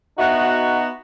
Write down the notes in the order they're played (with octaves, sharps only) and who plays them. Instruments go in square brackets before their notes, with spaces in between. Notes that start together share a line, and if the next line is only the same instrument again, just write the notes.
[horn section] B3 D#4 F#4 [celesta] E5 F#5 F#6